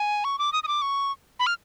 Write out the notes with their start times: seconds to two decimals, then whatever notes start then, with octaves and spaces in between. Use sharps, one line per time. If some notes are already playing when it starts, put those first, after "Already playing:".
Already playing: G#5
0.24 C#6
0.39 D6
0.53 D#6
0.63 D#6
0.68 D6
0.82 C#6
1.39 B5
1.47 F6